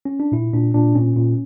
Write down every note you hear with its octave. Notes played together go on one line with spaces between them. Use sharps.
C#4
D4
A#2 E4
A#2 D4
A#2 D4
A#2 C#4
A#2